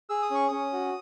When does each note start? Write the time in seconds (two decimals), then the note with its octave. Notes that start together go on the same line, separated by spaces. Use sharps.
0.10 G#4 E6
0.22 D#6
0.30 C#4 C#6
0.49 C#4 D#6
0.73 F#4